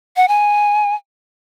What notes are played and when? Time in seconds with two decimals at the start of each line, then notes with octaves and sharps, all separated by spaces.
0.16 F#5
0.28 G#5